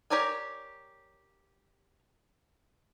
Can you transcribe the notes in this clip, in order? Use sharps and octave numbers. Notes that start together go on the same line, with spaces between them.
G4 A#4 C#5 D5 G#5